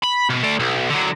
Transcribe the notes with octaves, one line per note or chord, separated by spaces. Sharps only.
B5
B2
A3 D5
B1
D3 F#3